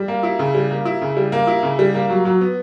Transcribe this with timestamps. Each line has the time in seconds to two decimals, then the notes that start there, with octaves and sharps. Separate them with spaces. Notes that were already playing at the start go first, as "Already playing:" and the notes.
Already playing: G3
0.08 A#3
0.23 E4
0.39 C#3
0.55 G3
0.71 A#3
0.85 E4
1.01 C#3
1.17 G3
1.32 A#3
1.47 E4
1.63 C#3
1.79 G3
1.94 A#3
2.10 F#3
2.25 F#3
2.41 B3